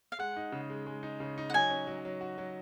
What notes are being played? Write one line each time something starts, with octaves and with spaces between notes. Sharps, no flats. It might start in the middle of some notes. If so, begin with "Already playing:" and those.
F5
G#3 F#5
D#4
C#3
G#3
G#3
D#4
C#3
D#4
F#5
F#3 G#5
C#4
F#3
F#3
F#4
F#3